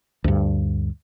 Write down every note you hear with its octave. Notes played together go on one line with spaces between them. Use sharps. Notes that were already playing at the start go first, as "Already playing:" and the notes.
D2 G2